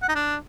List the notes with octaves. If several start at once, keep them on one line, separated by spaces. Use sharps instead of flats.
F#5
D#4
D4